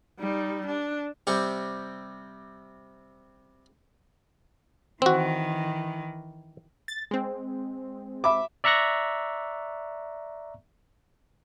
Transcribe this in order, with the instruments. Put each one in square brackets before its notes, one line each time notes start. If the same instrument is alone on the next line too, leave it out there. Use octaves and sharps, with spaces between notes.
[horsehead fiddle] G3 D#4
D4
[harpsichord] C3 G3 C4 G4 C#6
[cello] D#3 E3 [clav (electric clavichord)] C4 F#4
[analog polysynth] A6
G#3 C4
[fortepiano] E5 B5 D6
[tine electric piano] D5 E5 A#5 C#6 F#6 A#6